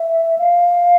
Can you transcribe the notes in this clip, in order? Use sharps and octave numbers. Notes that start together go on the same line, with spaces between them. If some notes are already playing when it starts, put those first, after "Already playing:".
Already playing: E5
F5